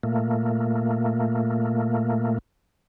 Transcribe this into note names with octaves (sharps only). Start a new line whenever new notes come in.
A#2 A3 A#3